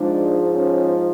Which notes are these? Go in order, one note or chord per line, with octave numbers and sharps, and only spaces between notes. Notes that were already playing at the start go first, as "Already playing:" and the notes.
Already playing: G#2 F3 G#3 D4
C#4